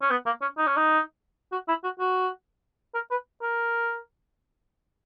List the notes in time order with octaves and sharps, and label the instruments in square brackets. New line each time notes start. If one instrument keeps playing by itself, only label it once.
[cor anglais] C#4
B3
A#3
C#4
D#4
C#4
D#4
F#4
E4
F#4
F#4
A#4
B4
A#4